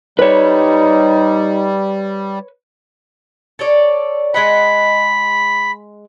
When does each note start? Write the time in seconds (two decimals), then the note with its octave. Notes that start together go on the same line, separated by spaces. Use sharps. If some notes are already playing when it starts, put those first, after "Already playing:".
0.19 G3 D#4 B4 C#5
3.59 A4 C#5 D5
4.34 G#3 D#5 F#5 B5